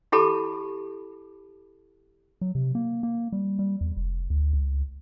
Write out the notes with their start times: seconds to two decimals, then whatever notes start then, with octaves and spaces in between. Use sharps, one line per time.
0.12 E4 G4 A4 A5 B5 D6
2.41 F#3
2.55 C3
2.75 A#3
3.03 A#3
3.32 G3
3.59 G3
3.81 E2
3.97 F1
4.30 D2
4.53 C#2